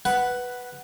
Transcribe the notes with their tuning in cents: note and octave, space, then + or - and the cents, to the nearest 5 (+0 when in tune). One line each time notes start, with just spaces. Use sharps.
B4 +0 F#5 +5